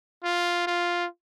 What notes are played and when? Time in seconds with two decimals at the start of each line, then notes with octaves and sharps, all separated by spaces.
0.24 F4
0.67 F4